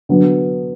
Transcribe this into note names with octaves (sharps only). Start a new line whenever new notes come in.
D3 F#3 B3